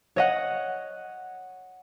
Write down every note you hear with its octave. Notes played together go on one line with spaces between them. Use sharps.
C#5 D#5 F#5